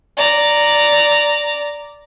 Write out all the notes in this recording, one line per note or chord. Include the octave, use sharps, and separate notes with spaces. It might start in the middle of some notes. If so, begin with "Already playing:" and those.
D5 A#5